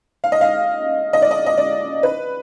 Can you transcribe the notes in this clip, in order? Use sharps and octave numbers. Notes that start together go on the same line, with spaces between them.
F5
D#5
F5
D#5
D5
D#5
D#5
D5
B4